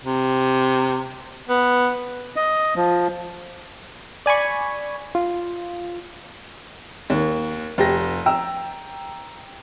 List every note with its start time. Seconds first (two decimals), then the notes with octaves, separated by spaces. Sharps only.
0.04 C3
1.48 B3
2.36 D#5
2.76 F3
4.26 D5 G#5 B5 C#6
5.15 F4
7.10 D#2
7.78 F1 G4 A#6
8.26 G5 A#5 E6